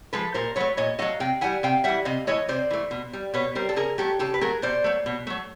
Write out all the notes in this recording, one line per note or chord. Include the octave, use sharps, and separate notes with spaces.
F3 G#3 A4 B4
A#2 A#4 C5
F#3 A3 B4 C#5
A#2 C#5 D#5
F#3 A3 D#5 F5
C3 F5 G5
E3 G3 F#5 G#5
C3 F5 G5
E3 G3 E5 F#5
C3 D#5 F5
E3 A3 C#5 D#5
C3 C5 D5
E3 A3
B2
G3
B2 B4 C#5
G3 A#4 C5
A4
C#3 G#4 A#4
F#3 A3 G4 A4
C#3 G4 A4
B4
F#3 A3 G#4 A#4
B2 C5 D5
F#3 A3
B2
F#3 A3